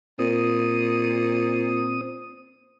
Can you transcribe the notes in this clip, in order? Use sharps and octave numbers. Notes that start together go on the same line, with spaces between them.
A#2 C4 D#6